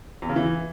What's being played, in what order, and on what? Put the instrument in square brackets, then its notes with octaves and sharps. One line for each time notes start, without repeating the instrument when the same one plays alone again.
[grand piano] E2
C#3
E3